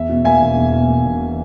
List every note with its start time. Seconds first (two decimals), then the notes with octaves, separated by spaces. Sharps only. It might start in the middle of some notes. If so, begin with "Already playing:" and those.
Already playing: E2 E5
0.09 B2
0.25 A#3 E5 G#5
0.40 E1
0.57 E2
0.73 B2
0.88 A#3
1.04 E1